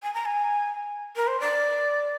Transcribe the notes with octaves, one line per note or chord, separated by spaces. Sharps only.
G#5
A#5
G#5
A#4
C5
D5